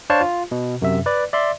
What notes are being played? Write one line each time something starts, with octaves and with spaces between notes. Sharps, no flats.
D4 C5 C#5 F5 A5 C#6
F4
B2
F#2 C3 E5
B4 D5
D5 E5 C6